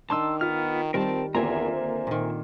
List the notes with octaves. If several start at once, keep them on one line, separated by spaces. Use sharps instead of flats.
D#3 D4 D#4 A5 C6 E6
B3 F4 F6
D#3 G3 C4 A#4 A5
E2 D3 A#3 C4 F4 E5 G#5 A#5
C5
A#2 D#3